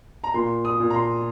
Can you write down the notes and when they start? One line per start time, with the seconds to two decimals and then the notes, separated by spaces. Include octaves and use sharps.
0.24 A#5
0.34 A#2 C6
0.65 D#6
0.80 A#2
0.90 A#5
0.94 C6